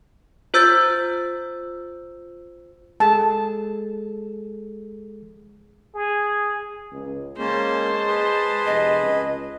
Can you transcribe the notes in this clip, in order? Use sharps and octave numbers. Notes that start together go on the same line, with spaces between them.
F4 C5 E6 G6 A6
G#3 G#4 A4 A5
G#4
C#2
G#3 A#3 C#4 C5 A5
G#4 B4
F1 D#5
C#2